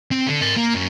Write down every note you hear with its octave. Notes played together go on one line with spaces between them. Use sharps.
C4
D3
A#4 G#5
A#3
F#2